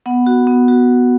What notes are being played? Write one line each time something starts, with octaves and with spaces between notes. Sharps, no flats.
B3 F#5 B5
F#4
B3
F#4